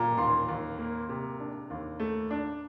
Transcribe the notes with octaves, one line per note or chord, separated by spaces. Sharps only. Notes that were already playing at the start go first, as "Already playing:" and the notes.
Already playing: A#2 A#5
D#2 C6
D#2
A#3
C3
D4
D#2
A3
D4